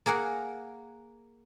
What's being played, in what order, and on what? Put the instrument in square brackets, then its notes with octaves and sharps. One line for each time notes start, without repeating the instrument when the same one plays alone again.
[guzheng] A#3 G#4 A#4 F#5